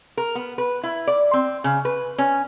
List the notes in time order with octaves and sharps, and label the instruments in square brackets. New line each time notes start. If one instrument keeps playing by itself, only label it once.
[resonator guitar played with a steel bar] A#4
B3
B4
E4
D5
C4
C#3
B4
C#4